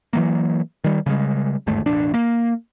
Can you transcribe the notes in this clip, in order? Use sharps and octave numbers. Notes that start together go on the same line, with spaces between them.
E3 F#3 A#3
D#3 G3
C#3 G3 G#3
G1 D#2 G#2 A3
E1 A1 D4
A#3